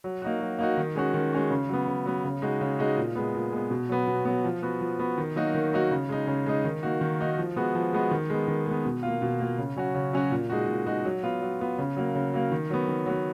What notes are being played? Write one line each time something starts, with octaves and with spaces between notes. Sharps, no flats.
F#3
A#3 D#4 F#4
F#3
A#3 D#4 F#4
D#3
G#3 C#4 F#4
D#3
G#3 C#4 F#4
C#3
F#3 B3
C#3
F#3 B3
C#3
G#3 D#4 F#4
C#3
G#3 D#4 F#4
A#2
G#3 B3
A#2
G#3 B3
B2
F#3 B3
B2
F#3 B3
F3
B3 F#4
F3
B3 F#4
D#3
F#3 A#3 D#4 F#4
D#3
F#3 A#3 D#4 F#4
C#3
G#3 D#4
C#3
G#3 D#4
D#3
A#3 D#4 F#4
D#3
A#3 D#4 F#4
F3
G#3 B3 F#4
F3
G#3 B3 F#4
D#3
G#3 B3
D#3
G#3 B3
B2
A#3 F4
B2
A#3 F4
C#3
F#3 C#4 F#4
C#3
F#3 C#4 F#4
A#2
G#3 D#4 F#4
A#2
G#3 D#4 F#4
F#3
B3 F4
F#3
B3 F4
C#3
F#3 A#3
C#3
F#3 A#3
D#3
F#3 B3
D#3
F#3 B3